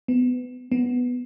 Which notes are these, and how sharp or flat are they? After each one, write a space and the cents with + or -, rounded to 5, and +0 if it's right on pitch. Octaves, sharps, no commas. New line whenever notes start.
B3 +20
B3 +0